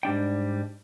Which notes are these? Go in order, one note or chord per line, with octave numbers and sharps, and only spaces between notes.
G#2 G3 D4 G5